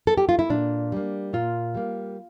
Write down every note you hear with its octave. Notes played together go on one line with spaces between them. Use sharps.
A4
G4
F4
E4
A#2 D4
G3 A#3
A#2 F4
G3 A#3